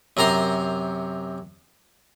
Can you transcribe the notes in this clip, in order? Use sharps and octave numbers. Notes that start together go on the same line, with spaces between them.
F#2 C3 A#4 A#5 C6